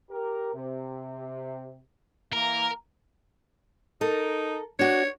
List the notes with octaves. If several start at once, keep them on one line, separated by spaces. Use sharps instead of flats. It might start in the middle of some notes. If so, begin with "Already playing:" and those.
G4 A#4
C3
E3 A#3 A#4 A#5
D#4 A4 A#4
D4 F#4 C#5